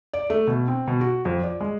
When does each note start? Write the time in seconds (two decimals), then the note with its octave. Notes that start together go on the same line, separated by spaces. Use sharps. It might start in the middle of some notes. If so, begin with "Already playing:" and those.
0.13 D5
0.30 A3
0.47 B2
0.68 C4
0.87 B2
1.01 F#4
1.25 F2
1.44 D5
1.61 G#3